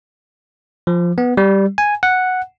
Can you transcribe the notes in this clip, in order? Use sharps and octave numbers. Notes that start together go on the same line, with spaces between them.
F3
B3
G3
G#5
F#5